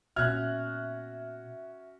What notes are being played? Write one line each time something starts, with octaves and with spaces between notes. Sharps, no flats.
A#2 B3 C#4 F#4 E5 F6 F#6 G#6